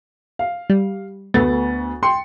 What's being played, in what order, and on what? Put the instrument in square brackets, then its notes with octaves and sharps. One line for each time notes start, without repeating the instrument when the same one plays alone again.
[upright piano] F5
[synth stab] G3
[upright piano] D2 B3 A6 [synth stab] A3
[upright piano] G5 C6 C#7